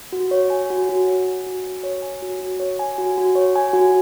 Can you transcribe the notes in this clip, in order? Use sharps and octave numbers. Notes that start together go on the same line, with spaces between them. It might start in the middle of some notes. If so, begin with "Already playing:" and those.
F#4
C#5
G#5
F#4
F#4
C#5
G#5
F#4
F#4
C#5
G#5
F#4
F#4
C#5
G#5
F#4
F#4
C#5
G#5
F#4